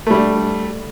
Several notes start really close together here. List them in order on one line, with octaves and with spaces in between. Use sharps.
A3 G3 D4